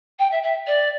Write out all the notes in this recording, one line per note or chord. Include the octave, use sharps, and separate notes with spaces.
G5
E5
E5
D5